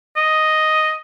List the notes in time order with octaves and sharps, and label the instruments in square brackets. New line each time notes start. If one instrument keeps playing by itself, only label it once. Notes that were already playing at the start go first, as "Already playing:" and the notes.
[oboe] D#5